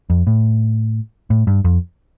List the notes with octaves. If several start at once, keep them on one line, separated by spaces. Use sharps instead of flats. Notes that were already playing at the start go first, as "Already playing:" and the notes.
F2
A2
A2
G2
F2